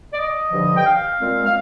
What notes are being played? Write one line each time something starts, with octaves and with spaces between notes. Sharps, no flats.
D5
D#5
G2 D3 F3
G5
F5
A#2 G#3 C4
F5